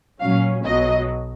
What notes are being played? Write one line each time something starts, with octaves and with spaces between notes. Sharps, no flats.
A#2 F#3 C#4 F5
B1 B2 F#3 D#5